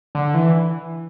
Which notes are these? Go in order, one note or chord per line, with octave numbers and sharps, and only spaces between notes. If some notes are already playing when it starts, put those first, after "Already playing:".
D3
E3